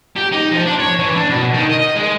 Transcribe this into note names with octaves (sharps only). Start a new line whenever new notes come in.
G4
D#4
F3
D4
C#5
E3
D4
B2
D#3
D#5
G#3